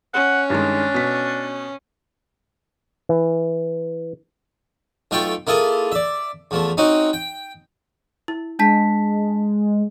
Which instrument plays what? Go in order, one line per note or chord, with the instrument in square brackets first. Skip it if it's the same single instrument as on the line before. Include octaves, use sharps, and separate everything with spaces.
[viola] C#4 [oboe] F#5
[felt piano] G2 D#3 G#3 [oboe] D4
[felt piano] B2 B6
[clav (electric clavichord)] E3
[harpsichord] B1 A3 F4 A4 G5 C#6
A#3 E4 F4 G#4 A4
D5 E5
E2 F3 A3
C4 C#4 D#4 F#4
G5
[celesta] E4
[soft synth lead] G#3 [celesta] D4 A5 B6